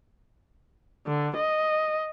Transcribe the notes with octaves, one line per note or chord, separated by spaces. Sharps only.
D3
D#5